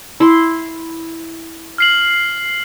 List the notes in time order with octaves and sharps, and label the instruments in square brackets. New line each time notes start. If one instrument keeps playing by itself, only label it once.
[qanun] E4 C6
[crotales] F6 C7 F#7